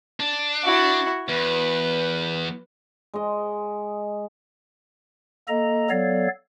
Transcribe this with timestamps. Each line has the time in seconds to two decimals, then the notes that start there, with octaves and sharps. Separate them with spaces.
0.20 D4
0.64 E4 F#4
1.29 E2 B4
3.14 G#3 D#5
5.48 A#3 A4 D#5 A#5
5.90 F#3 B3 A4 C#5 D5 F5